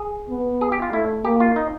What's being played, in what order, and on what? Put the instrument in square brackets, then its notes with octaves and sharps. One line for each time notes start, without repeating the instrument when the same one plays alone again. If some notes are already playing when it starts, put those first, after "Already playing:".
Already playing: [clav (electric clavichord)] G#4
[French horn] B3
[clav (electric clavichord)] G#4
G4
F4
[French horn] A3 [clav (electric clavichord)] E4
[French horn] A#3 [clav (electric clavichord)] G4
[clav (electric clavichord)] F4
D#4